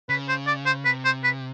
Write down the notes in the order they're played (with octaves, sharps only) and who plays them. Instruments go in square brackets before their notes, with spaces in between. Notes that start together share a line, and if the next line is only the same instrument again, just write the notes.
[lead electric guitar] C#3 [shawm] B4
[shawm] C5
D5
C5
[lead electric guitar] C3 [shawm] B4
[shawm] C5
B4